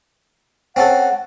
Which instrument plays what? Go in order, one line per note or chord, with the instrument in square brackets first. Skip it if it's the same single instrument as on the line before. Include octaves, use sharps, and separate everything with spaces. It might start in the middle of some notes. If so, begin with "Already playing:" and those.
[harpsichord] C4 C#4 A4 [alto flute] F#5